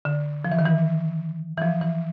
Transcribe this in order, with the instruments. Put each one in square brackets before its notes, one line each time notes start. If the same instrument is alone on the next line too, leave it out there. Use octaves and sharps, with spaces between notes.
[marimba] D3
F3
E3
D#3
E3
E3
F3
E3